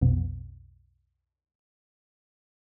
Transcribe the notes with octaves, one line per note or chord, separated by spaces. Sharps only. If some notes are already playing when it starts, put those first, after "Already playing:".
B1 F2 B2